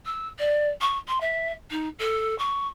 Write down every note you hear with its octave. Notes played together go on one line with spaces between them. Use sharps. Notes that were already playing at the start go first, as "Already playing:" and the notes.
E6
D5
C#6
C6
E5
D#4
A4
C#6